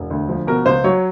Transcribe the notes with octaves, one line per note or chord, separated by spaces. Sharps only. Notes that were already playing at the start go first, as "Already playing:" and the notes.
Already playing: E1
D2
F3
B2 A#4
C#2 C5
F#3 C#5